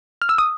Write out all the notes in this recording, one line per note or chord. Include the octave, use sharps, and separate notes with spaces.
F6
E6
D#6